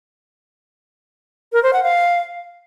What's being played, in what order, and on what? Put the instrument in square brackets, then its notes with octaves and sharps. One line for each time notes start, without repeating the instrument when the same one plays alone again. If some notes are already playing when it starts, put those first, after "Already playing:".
[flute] A#4
C5
F#5
F5